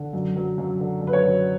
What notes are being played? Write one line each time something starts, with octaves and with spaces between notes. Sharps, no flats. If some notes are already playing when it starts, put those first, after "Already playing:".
Already playing: D3
F#2
F#3
F#2
D3
F#2
B4
C#5
F#2